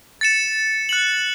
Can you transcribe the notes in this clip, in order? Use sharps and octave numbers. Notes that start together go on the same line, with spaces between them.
A6 C#7 E7
F#6 C#7 F#7